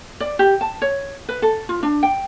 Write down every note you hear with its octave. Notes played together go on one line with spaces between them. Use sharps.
D5
G4
A5
C#5
B4
A4
F4
D4
G5